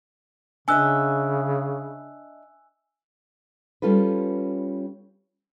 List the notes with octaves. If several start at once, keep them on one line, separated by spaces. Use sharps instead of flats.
C#3 D4 D#5 E5 G#5 E6 F#6
G3 C#4 F4 A4 B4